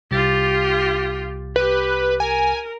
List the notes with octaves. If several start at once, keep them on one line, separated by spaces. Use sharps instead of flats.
C2 F4 G4 A6
G4 B4
A#4 G#5